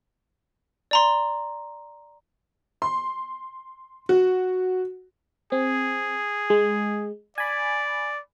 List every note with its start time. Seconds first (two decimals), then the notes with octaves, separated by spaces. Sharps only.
0.91 D5 A#5 C6
2.82 C6
4.09 F#4
5.52 C4 G#4
6.50 G#3
7.38 D5 G#5 B5